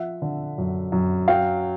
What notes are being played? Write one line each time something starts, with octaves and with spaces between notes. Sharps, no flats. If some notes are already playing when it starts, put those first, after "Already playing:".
Already playing: F3 E5 F#5
D3
F#2
F#2
F#3 F5 G5